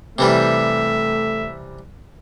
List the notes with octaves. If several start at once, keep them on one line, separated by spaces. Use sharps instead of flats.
C3 E3 G3 A3 E5